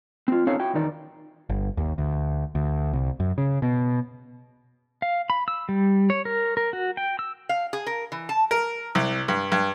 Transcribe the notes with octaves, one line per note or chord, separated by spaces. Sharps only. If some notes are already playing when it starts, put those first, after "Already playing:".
C4 F4
C4 C#4 D#4 A4 C#5 F5
E4 F#4 G5
E2 D#3 D#4 D5
G1
D#2
D2
D2
C2
F#2
C#3
B2
F5
B5
E6
G3
C#5
A#4
A#4
F#4
G5
E6
F5
G#4
A#4
E3
A5
A#4
C2
G2
G2